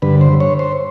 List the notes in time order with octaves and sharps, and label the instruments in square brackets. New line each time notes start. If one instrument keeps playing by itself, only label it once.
[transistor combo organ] G2 D3 B4
C5
C#5
C5